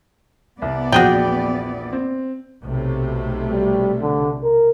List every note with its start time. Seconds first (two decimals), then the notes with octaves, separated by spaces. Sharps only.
0.62 C2 B3 D5
0.92 A#1 E2 F#4 G#4 G5
1.93 C4
2.62 B1 C3 A3
3.52 G3
4.01 D3
4.43 A#4